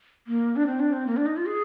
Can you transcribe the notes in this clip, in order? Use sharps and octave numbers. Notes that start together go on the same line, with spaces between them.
A#3
D4
C4
D4
C4
A#3
D4
D#4
F4
G#4